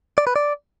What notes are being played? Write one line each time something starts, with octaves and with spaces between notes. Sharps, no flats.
D5
B4
D5